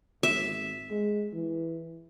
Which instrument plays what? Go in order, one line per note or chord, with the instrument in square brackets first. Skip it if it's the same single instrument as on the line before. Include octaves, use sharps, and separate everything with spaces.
[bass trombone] G#1 [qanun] E5
[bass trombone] G#3
E3